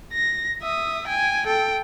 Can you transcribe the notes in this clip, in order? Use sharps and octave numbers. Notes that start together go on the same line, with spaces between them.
A#6
E5 D#6
G5 G#5
A4 G5